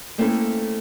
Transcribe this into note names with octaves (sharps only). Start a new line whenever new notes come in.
A3 A#3 C4 C#4 E4 A4